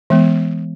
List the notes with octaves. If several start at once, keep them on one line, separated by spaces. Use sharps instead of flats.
E3 G#3 B3